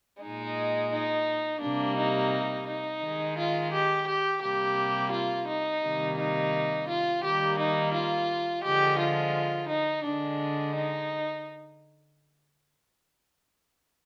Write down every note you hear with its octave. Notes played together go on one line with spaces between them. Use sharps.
A#2 G#3 D#4
D#4
C3 G3 A#3 D4
D#4
D#4
D#3 G#3
F4
G4
G4
C3 G3 A#3 G4
F4
D#4
C3 D#3 G3 A#3
D#4
F4
D#3 G3 A#3 G4
D#4
F4
D3 F3 G#3 G4
F4
D#4
D3 G#3 D4
D#4